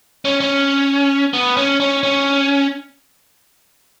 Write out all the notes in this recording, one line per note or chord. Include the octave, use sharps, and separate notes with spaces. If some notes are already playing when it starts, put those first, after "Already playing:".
C#4
C#4
B3
C#4
C#4
C#4